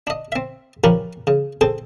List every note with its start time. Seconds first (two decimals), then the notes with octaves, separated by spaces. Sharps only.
0.07 D4 D#5
0.32 C4 E5
0.84 F3 C#4 G4 A#4 B4
1.27 C#3
1.61 C4 G#4 A4 C5